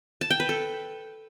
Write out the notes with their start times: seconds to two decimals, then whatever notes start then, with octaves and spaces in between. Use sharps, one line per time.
0.21 A5
0.30 G5
0.40 B4
0.49 A4